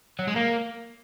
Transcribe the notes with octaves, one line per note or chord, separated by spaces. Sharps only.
F#3
G#3
A#3